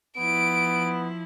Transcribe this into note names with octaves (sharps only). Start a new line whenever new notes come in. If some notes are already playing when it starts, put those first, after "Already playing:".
F3 B3 E4 D7